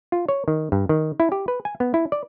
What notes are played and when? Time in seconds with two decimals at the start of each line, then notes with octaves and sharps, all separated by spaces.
0.12 F4
0.29 C#5
0.48 D#3
0.72 G2
0.89 D#3
1.20 E4
1.32 G4
1.48 B4
1.65 G#5
1.80 B3
1.94 E4
2.12 D5